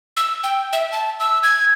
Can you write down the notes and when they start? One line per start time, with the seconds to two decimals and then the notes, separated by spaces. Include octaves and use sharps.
0.17 E6
0.43 G5
0.73 E5
0.92 A5
1.20 E6
1.43 G#6